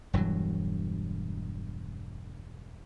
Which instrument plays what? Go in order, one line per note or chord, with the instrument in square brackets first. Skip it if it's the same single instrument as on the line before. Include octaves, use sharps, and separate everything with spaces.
[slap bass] E1 G2 E3 F#3